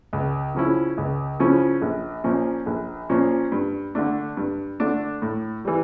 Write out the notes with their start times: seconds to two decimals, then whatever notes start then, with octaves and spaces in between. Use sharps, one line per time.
0.13 C#2
0.55 C#3 F3 C#4 E4
0.98 C#2
1.39 C#3 F3 C#4 E4
1.82 A#1
2.24 A#2 F3 C#4
2.66 A#1
3.10 A#2 F3 C#4
3.52 G2
3.95 D3 A3 D4
4.37 G2
4.80 D3 A3 D4
5.22 A2
5.65 E3 G3